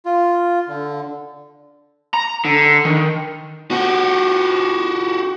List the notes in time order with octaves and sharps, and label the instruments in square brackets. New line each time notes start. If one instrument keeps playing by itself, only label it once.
[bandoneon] F4
D3
[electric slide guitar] A#5
D3
D#3
[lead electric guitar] F#4 G4